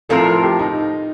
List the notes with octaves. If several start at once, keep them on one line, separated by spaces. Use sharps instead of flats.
A2 F3 C4 F4 A4 A#4
G4
D#4